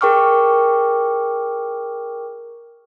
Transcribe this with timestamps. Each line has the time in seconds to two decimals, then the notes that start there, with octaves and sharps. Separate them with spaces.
0.01 G#4 A#4 G5 C#6 D6 F6